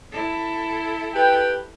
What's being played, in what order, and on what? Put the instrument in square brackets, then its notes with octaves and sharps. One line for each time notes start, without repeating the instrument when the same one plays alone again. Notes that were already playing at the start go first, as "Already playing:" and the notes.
[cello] E4 A4
[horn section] G4 B4 G5